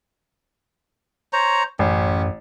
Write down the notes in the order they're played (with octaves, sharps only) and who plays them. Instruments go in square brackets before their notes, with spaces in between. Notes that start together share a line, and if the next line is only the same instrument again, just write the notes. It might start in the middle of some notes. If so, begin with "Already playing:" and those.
[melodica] C5 C#5 A#5
[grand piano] A1 [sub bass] F#2 [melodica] C#4